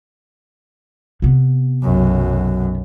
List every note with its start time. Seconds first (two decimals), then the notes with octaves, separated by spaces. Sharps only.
1.22 C3 B3
1.82 B1 F#2